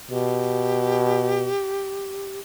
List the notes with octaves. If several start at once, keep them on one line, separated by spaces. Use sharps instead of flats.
B2 G4